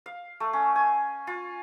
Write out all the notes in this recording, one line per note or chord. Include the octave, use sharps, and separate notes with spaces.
F5
A3
C#4
G#5
F4